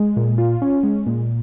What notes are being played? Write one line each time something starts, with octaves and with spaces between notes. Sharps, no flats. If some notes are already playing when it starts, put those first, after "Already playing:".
Already playing: G#3
A#2
F4
C#4
G#3
A#2